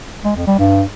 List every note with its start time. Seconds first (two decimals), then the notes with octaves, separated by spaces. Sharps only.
0.25 G#3
0.36 F2
0.47 G3
0.59 G2